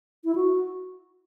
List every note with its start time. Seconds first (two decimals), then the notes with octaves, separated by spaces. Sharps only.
0.24 E4
0.35 F#4